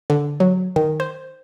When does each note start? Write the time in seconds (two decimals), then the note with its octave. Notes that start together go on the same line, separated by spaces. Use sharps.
0.10 D3
0.40 F#3
0.76 D#3
1.00 C5